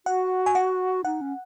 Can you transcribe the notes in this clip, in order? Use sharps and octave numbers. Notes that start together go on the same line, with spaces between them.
F#4 F#5
G#5
F#5
D#4 F#5
C#4